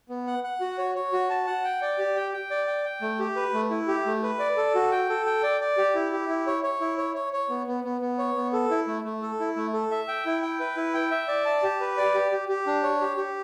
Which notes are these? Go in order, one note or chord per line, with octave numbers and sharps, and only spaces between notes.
B3
F#5
F#5
F#4
C#5
C#5
F#4
A5
F#5
G5
D5
G4
G5
G5
D5
G5
G5
A3
G4
B4
A3
E4
G4
A3
B4
D5
A4
F#4
G5
A4
G5
D5
D5
G4
E4
G4
E4
C#5
C#5
E4
C#5
C#5
C#5
B3
B3
B3
B3
C#5
B3
A4
E4
A3
A3
A4
E4
A3
A4
E5
G5
E4
G5
B4
E4
G5
E5
D5
A5
G4
B4
D5
G4
G4
G4
D4
C#5
G4
G4